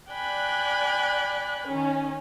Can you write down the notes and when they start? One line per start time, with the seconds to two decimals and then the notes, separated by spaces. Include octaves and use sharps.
0.11 D5 G5 G#5 B5 F#6
1.67 D#3 C#4